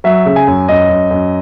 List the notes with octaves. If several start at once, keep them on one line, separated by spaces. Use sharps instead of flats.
F#3 E5
C#3
G#5
F#2
F#2 D#5
F#2
F#2